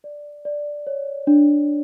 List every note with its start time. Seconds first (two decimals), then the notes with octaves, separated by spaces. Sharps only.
0.04 D5
0.45 D5
0.87 C#5
1.27 D4